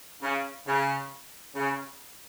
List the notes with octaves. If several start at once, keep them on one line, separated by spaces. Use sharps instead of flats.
C#3
C#3
C#3